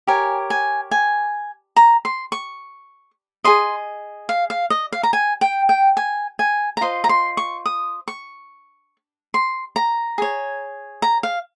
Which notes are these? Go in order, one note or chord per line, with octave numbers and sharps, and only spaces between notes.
G4 A#4 C#5 G#5
G#5
G#5
A#5
C6
C#6
G#4 D#5 C6
F5
F5
D#5
F5
A#5
G#5
G5
G5
G#5
G#5
A#5
F4 C5 D#5 C6
A#5
C6
C#6
D#6
C#6
C6
A#5
G#4 C#5
A#5
F5